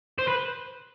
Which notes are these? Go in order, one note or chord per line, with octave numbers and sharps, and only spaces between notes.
C5
B4